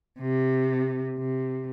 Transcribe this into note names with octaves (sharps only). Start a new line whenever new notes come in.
C3
C3